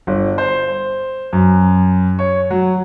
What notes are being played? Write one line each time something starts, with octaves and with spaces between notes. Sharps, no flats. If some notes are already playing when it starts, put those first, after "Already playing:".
G1
C5
F#2
C#5
F#3